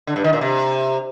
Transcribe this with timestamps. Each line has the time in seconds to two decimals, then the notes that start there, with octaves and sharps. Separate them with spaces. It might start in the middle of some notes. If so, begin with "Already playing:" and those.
0.07 D3
0.16 G2
0.24 D#3
0.33 A#2
0.41 C3